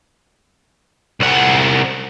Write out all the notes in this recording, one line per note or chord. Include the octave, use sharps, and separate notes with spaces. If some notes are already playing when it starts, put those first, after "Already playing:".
C2 F#5